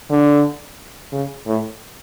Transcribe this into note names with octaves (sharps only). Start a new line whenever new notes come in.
D3
C#3
A2